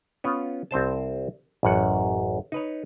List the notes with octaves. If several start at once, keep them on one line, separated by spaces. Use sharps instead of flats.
B3 C#4 F4
C2 C4 C5 A5
A1 F#2 F#5
D#4 B4 C#5